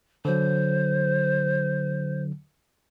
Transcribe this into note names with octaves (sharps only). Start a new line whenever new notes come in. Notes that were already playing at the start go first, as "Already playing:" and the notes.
D3 F#3 C5